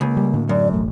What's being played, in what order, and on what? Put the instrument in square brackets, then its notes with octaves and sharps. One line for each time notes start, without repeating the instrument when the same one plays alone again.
[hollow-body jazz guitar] C#2 [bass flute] A#3
[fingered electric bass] G3
A2 D3
[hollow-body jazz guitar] F#2 [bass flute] D5
[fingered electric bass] E1 A1 [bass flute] A3